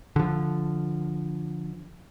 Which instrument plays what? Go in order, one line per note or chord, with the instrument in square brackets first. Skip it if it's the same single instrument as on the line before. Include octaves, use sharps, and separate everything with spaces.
[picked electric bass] D3 F3